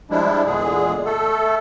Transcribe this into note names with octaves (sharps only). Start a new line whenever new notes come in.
F3 G3 G#3 D4 E4
E2 A#2 D3 G#3 G#4
A3 A4